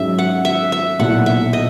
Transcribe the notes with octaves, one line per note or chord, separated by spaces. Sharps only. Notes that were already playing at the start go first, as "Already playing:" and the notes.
Already playing: G#2 F#3 C#4 E5
F#5
E5
E5
B1 A#2 A#3 E4 F#5
E5
D#5